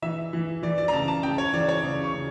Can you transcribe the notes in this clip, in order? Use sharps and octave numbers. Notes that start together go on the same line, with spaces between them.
E3 E5
E3
E3 D5
D5
A#5
C#3 A5
A5
C#3 G5
C#5
E3 D5
C#5
C#3 D5
C#6
C#3